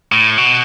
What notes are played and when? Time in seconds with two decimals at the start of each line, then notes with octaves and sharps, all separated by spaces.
0.12 A2
0.37 B2